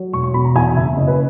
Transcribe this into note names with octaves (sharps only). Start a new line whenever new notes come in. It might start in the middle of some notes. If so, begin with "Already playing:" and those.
Already playing: F#3
E1 C#6
C#6
B2 B5
A#5
E2 G#5
F#1 E5
F#1 D#5
B4